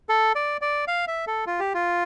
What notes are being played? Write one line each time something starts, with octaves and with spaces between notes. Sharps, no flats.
A4
D5
D5
F5
E5
A4
F4
G4
F4